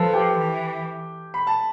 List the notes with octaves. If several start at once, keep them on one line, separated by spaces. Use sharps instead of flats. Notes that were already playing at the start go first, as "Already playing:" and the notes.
Already playing: F3 A4 B4 A5
G4 G5
E3
B5
A5